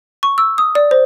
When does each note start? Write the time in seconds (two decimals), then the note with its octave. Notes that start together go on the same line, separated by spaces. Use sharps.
0.23 C#6
0.38 E6
0.58 D#6
0.75 D5
0.91 C5